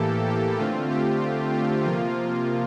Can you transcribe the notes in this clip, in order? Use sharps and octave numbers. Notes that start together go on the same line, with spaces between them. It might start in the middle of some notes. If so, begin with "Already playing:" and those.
Already playing: A2 E3 A#3 G4 A4
G4
D3 A3 C4 F4
G4
F4
C3 F3 A#3 F4